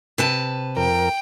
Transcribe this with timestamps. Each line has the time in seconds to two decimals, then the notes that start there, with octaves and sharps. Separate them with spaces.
0.18 C3 B4 A5
0.77 F2 A#4 G5